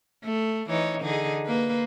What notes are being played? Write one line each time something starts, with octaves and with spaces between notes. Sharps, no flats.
A3
E3 D#4 C#5
D3 D#4 G#4
A#3 B4